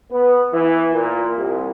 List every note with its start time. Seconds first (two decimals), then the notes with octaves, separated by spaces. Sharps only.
0.12 B3
0.53 E3
0.93 A#2
1.36 C2